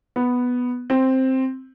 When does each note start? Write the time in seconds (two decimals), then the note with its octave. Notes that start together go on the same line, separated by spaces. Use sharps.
0.16 B3
0.90 C4